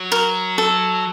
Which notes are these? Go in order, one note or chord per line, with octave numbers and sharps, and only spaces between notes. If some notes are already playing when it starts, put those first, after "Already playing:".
Already playing: F#3
A#4
A4